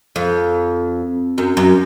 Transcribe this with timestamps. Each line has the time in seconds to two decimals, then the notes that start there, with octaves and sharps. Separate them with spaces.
0.16 F2
1.38 F#2
1.57 F#2